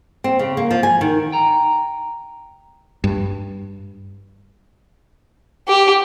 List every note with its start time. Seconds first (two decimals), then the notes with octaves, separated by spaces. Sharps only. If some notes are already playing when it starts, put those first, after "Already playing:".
0.24 C4
0.39 C#3
0.57 A#3
0.71 F3
0.83 G#5
1.01 D#3
1.32 G5 A#5
3.04 G2
5.68 G4